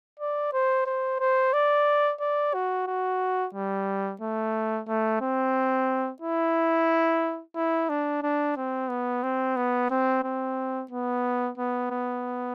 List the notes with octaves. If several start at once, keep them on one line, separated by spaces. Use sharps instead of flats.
D5
C5
C5
C5
D5
D5
F#4
F#4
G3
A3
A3
C4
E4
E4
D4
D4
C4
B3
C4
B3
C4
C4
B3
B3
B3